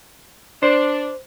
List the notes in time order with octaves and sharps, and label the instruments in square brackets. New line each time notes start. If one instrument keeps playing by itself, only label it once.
[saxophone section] D4 [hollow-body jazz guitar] C5